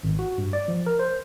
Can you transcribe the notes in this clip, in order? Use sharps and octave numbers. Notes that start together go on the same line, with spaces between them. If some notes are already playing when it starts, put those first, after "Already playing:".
G#1
F#4
G2
D5
F3
A#4
C5